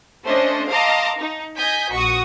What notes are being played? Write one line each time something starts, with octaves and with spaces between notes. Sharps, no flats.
A3 C#4 D4 C5 D#5
D#5 F5 A5 A#5 C6 D6
D#4
D#5 G#5 G6 B6
A#1 F#4 C#6 D#6